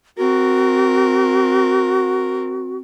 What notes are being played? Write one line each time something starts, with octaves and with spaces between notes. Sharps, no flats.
C4 F#4 A#4